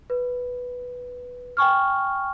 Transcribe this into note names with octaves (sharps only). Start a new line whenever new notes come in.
B4
G5 G#5 C#6 F6